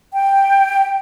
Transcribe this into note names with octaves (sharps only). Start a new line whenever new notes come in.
G5